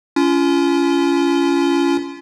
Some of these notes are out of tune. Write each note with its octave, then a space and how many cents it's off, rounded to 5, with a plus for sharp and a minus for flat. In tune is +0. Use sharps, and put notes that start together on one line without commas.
C#4 +25 F4 -30